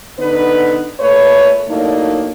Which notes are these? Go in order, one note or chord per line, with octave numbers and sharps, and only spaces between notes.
D3 B3 D#4 B4
A#2 A3 B4 C#5
A2 F#3 A3 A#3 D4 D#4